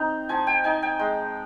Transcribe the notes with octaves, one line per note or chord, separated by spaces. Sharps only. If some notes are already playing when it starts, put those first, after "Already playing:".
Already playing: C4 D#4
F3 G#5
G5
D#4 G#5
G5
G#3